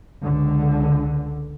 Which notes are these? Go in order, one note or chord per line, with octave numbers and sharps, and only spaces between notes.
C#2 D3